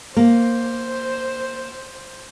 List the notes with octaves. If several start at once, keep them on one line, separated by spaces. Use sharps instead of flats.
A#3 C5